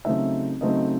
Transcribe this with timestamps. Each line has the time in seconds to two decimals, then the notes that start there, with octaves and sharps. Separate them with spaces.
0.05 C#3 F#3 A3 C4 D#4 E5
0.61 C#3 F#3 A3 C4 D#4 D#5